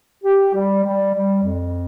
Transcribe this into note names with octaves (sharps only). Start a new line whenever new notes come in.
G4
G3
G3
G3
F2